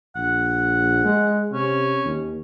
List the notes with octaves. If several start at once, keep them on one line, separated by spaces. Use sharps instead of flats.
A#1 F#5
G#3
C3 C#4
D#2